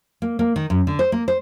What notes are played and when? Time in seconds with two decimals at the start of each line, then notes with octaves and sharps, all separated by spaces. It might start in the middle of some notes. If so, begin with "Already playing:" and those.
0.22 A#3
0.39 A#3
0.56 D#3
0.70 F#2
0.87 D3
0.99 C5
1.12 A#3
1.28 C5